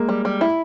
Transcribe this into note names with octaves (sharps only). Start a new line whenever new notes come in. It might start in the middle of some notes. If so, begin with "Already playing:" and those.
Already playing: G#3 A#3
G3
G3
E4